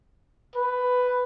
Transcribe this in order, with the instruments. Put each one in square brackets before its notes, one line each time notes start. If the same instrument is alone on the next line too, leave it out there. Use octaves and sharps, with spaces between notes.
[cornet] B4